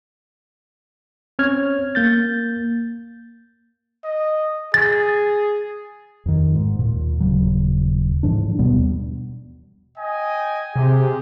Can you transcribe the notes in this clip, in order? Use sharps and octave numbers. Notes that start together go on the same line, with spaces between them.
C4 C#4 C#5 F6 G#6
A#3 G6 A6
D#5
G#4 A6
F2 D#3
G#2
D#2 A#2
D#1 B1 C#3 F#3
G#2 E3 F3 D4
D#2 B2 G3 B3
D#5 G5 G#5
C3 G4 G#4